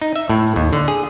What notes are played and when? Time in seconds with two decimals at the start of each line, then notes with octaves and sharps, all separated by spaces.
0.02 D#4
0.16 E5
0.30 A2
0.56 D#2
0.73 D3
0.88 G#4